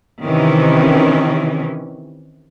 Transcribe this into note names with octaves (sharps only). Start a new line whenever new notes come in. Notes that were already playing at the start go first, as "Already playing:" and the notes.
C3 D#3 E3 C#4